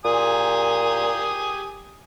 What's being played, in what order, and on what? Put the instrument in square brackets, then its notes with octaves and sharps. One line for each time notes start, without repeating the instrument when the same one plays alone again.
[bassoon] A#2 [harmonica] G4 G#5 D#6